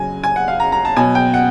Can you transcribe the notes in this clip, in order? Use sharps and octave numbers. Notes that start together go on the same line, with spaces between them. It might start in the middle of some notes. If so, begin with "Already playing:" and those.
Already playing: C#3 F#3 G#5
G#5
F#5
F5
A#5
A#5
A5
B2 F#3 G#5
G5
F#5